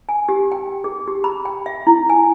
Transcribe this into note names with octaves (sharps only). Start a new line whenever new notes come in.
G#5
G4
G5
G#4
G4
B5
G5
E5
E4
G#5